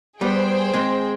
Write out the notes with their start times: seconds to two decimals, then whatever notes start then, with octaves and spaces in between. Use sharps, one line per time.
0.21 G3 B3 G#4 C5 G5
0.73 G#3 C4